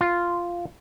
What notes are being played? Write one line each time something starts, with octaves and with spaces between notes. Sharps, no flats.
F4